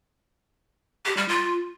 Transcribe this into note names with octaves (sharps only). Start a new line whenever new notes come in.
G4
G3
F4